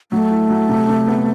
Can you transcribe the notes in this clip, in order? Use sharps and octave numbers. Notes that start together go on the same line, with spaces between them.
F#3 A3
E4
F#3
C3
C3
B3